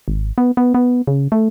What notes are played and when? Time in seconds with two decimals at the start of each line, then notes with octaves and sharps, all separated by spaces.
0.08 G#1
0.38 B3
0.57 B3
0.74 B3
1.07 C#3
1.32 A3